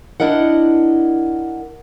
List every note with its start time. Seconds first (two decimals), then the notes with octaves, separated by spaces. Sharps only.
0.20 D4 E4 A#4 D#5 F#5